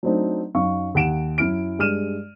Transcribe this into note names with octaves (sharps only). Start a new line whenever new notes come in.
F#3 A3 C4 D4 D#4
F#2 D#4 F5 C#6
D#2 F#5 D7 E7
F#2 E4 F6 D7
G2 G#3 F6 D#7 E7